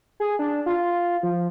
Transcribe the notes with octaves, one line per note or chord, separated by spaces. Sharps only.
G#4
D4
F4
F3